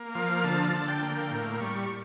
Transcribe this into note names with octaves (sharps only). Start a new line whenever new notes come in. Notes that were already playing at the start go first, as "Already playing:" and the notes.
Already playing: A#3
F3 F5
D3 A5
D3
G5
A#3
A2
G3 C#6